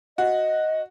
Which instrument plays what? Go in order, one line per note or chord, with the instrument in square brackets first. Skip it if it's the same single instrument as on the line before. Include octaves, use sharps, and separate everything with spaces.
[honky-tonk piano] F#4 [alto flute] D#5